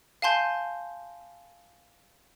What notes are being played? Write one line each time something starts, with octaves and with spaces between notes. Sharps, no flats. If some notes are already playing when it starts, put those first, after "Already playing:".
F5 G#5 A5 C6 G6